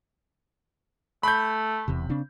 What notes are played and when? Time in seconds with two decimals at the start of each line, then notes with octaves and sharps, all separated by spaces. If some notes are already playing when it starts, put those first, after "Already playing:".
1.23 A3 B5 G6
1.88 E1 E2 C3
2.09 C#3 C4 D4